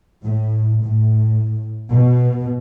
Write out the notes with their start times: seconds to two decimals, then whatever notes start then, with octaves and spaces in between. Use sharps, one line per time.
0.25 A2
0.84 A2
1.92 B2